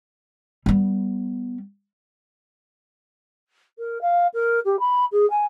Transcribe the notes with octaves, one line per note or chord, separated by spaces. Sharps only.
G3 B3
A#4
F5
A#4
G4
B5
G#4
G#5